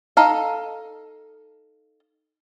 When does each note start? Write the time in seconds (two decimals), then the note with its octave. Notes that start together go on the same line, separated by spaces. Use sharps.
0.17 D#4 A4 F5